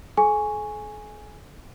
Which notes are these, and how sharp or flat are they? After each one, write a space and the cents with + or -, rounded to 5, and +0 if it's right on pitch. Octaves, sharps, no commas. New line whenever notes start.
A4 -45 G#5 +0 C#6 +0